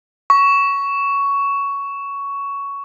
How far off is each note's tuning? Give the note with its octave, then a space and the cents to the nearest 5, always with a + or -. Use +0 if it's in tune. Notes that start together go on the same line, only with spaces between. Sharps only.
C#6 +10